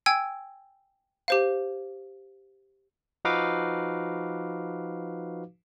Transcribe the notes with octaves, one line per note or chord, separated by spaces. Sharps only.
G5 G#5 E6 G#6
G4 C5 F5
F3 D#4 F#4 B4 F5 D6